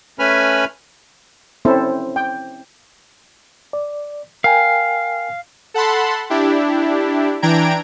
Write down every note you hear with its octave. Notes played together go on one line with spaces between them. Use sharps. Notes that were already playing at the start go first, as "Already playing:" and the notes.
A3 C#4 B4 G#5 B5 F6
C4 C#4 E4 A4 C5
G5
D5
A#4 F5 G5 G#5
A4 F#5 A5 B5 C6
D4 E4 G4
E3 D4 G5 A#5 G#6 D7